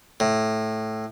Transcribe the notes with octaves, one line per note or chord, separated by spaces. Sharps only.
A2